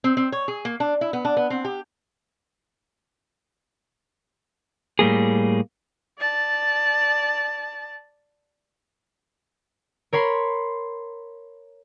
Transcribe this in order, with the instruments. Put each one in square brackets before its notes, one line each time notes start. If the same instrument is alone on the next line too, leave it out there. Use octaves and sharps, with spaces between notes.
[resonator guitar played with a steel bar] C4
C4
C#5
G#4
A#3
D4
E4
B3
D4
B3
C4
G4
[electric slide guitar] A2 G3 A#3 G#4
[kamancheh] D5 A5
[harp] A#4 C#5 B5 C6